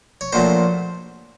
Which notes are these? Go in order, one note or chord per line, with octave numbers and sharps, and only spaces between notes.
C#5
A#1 A#2 F#3 A3 C5